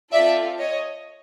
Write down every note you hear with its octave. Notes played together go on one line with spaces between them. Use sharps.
C4 F4 A4 D5 E5
C#5 D#5